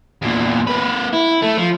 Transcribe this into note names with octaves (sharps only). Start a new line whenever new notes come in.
E2 A#2
A#3 B4
E4
A3
F3